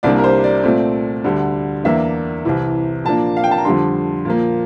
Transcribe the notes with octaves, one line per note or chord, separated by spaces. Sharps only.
C2 C3 G3 A#3 D4 D5
A#4
C5
D5
A#2 A3 C4
D2 D3 G3
E2 E3 A#3 D4 E5
C2 C3 E3
A#2 F3 A#3 D4 A5
F5
G5
A5
A#5
F2 D3 G3 D4 C6
A#2 F3 A#3